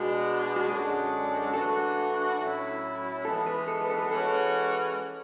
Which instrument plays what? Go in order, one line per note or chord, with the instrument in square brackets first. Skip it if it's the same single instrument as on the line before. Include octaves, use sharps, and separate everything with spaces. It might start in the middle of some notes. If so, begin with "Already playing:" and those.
Already playing: [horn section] B2 G#3 D4 [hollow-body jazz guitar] F#4
[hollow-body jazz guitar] F#4
[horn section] F#2 D3 G#3 D4 F#4 [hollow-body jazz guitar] G#4
[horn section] E3 A3 D4 F#4 [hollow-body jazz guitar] A4
[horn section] A2 F#3 C#4 E4
[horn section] E3 G#3 B3 [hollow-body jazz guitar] A4
[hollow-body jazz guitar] B4
A4
B4
A4
B4
[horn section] E3 G#3 C#4 F#4 [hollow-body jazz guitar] A4